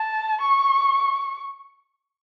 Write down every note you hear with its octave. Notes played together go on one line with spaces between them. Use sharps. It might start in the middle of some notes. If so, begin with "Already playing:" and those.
Already playing: A5
C#6